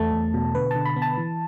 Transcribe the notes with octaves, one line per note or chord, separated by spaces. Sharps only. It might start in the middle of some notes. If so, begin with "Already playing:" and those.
Already playing: E2 A3 A5
E2
B2
D3 B4
D3 A5
B5
B3
A5
E3